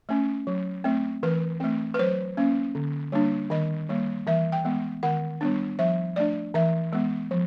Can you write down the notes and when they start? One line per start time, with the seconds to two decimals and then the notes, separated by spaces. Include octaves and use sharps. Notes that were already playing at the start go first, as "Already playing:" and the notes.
0.09 A3 C#4
0.47 F#3
0.84 A3 C4
1.23 E3 B4
1.60 A3 C4
1.94 B4
1.99 F#3 C5
2.37 A#3 C#4
2.75 D3
3.12 G3 A#3 D4
3.50 D#3 D#5
3.89 G3 A#3
4.27 E3 E5
4.52 G5
4.65 G#3 B3
5.03 D#3 F#5
5.41 G3 B3 D4
5.79 F3 E5
6.16 A3 D4 D5
6.54 E3 E5
6.93 G#3 B3
7.31 F3